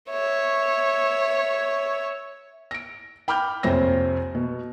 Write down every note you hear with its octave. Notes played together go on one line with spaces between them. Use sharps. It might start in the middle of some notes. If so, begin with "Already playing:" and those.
C#5 E5
A#6 D7
G5 B5 D6 F6 G6
A#1 F2 C3 C5 C#5 A#6
B2